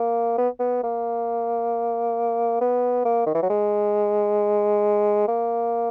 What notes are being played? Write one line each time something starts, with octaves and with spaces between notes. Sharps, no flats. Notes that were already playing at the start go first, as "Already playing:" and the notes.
Already playing: A#3
B3
B3
A#3
B3
A#3
D#3
E3
F#3
G#3
A#3